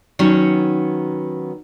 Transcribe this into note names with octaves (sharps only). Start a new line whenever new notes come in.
D#3 F#3 B3 C#4